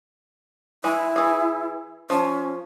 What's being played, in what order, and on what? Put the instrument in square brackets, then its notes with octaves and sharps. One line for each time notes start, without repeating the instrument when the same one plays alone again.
[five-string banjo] E3 G#3 [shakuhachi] E4
[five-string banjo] E3 G#4
[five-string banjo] F3 [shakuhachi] C#4